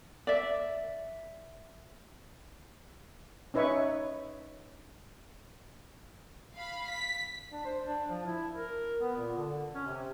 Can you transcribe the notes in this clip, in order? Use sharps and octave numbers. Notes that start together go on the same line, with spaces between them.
D5 E5
C#4 D#4 B4 C#5 E5 C#6
F5 B5
B6
D4
C5
D4
F3
E4
A#4
B3
A#2
D3
C#4
C3